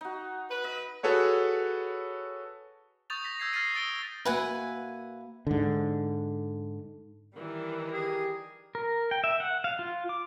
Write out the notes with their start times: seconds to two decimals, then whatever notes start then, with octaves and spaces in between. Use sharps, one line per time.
0.01 D#4 F#4
0.51 B4
0.64 D#5
1.03 F#4 G#4 A4 B4 C#5 F#5
3.10 C#6 D#6 G6 A6 F7
3.24 A#6 B6
3.40 E6 G6 G#6 A#6 C7
3.53 F6 A6 A#6 C7 D#7
3.74 D#6 A6 D7 G7
3.89 E6
4.25 A#3 F#4 B4 E5 F#5 G#5
5.47 G#2 D3
7.36 D#3 E3 G3 A#4
7.92 G4 G#4
8.75 A#4
9.11 G5
9.24 E5
9.40 F#5
9.64 F5
9.79 F4
10.09 D6